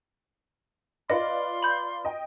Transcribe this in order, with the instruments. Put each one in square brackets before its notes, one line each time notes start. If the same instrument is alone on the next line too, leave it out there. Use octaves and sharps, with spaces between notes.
[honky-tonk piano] F4 B4 D5 [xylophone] D#5 [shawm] C6
[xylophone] B5 G6
[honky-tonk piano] D#5 G5